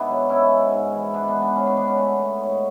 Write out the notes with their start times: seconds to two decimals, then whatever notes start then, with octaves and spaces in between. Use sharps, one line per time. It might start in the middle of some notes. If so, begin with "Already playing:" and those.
Already playing: G#2 B3 D4 E4 G#4
0.09 F#3
0.29 G#3 C#4 E4
0.51 G#3
0.71 G#2
0.93 E3
1.13 G#3 B3 D4
1.28 B3 D4
1.35 G#3
1.41 B3 D4
1.55 G#3 C#4
1.66 B3 D4
1.76 G#3 B3 D4
1.88 C#4
1.97 A3 B3
2.19 A3
2.40 G#2 C#4